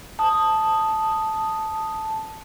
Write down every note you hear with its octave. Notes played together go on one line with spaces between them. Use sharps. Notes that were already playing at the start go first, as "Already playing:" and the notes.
A5 D#6